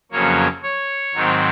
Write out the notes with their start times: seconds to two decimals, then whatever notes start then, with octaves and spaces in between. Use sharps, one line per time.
0.12 F2 C#3 F#3 A#3 C#5
0.63 C#5
1.15 G#2 D#3 F#3 C4